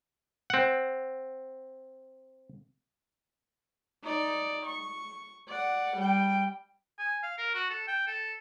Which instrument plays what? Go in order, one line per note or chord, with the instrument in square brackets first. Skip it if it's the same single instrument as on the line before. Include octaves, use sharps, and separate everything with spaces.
[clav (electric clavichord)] C4 F#5
[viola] D#4 D5
C#6
D5 F#5
G3 G5
[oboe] G#5
F5
A#4
F#4
A4
G5
A4